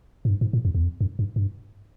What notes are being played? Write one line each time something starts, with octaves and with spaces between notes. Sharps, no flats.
G#2
G2
G#2
A2
F2
E2
F2
F#2
G2
G2